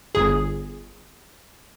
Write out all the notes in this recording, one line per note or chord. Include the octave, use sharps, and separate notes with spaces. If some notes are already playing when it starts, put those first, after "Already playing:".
G1 G#4